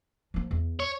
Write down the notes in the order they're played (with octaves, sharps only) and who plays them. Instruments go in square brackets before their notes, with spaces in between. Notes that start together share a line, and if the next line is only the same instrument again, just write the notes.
[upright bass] F3 A#3
E2
[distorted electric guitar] C#5